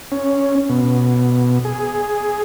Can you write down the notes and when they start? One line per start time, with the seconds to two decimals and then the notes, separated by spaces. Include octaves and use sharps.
0.12 C#4
0.69 B2
1.65 G#4